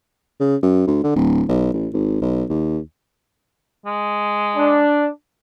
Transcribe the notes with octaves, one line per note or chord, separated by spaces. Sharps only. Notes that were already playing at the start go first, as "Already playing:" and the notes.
C#3
F#2
D2
D3
D1
B1
A1
G#1
B1
D#2
G#3
D4